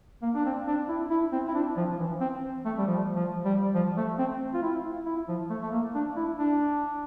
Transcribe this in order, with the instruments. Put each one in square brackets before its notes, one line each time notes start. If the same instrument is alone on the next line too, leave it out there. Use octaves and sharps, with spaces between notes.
[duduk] A#3
D4
C4
D4
E4
E4
C4
E4
D4
F3
F3
E3
C4
A3
G3
F3
F3
G3
F3
A3
C4
F4
E4
E4
F3
A3
A3
A#3
D4
E4
D4